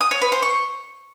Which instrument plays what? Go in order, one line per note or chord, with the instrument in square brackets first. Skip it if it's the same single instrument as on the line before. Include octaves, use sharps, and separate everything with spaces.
[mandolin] D#6
C#5
B4
C5
C#6